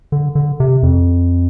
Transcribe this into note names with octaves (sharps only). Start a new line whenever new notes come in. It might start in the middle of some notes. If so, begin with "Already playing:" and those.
D3
D3
C3
F2